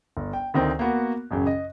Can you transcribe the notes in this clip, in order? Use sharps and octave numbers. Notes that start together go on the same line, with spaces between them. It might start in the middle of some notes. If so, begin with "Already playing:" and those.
G1
G5
D2 D#3 C4
A#3 B3 F#4
A1 F#2 C#3
D#5